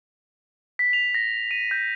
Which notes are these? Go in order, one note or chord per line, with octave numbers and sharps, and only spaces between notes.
B6
F7
A#6
D#7
G6